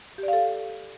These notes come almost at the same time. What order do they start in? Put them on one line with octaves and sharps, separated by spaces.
G4 D5 F5 A4